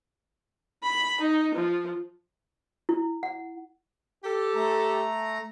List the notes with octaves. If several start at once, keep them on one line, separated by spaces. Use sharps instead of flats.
B5
D#4
F3
E4
F#5
G4 A4
A3 A#5